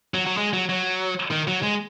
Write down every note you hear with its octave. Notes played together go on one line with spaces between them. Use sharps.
F#3
F#3
G#3
F#3
F#3
D#3
F#3
G#3